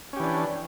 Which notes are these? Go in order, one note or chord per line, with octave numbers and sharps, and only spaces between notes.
E3 C#4 D4 G4